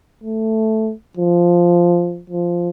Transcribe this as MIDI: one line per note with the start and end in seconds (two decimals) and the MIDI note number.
0.23 0.93 57
1.17 2.22 53
2.30 2.69 53